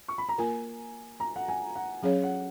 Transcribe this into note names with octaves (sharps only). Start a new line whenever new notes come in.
C#6
B5
A#5
A#3 F4 A#4 G#5
A#5
F#5
G#5
F#5
F#3 C#4 G#4 C#5 F5
F#5